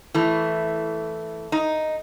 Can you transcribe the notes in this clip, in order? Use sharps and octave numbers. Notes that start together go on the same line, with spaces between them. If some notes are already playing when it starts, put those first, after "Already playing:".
E3 A3
D#4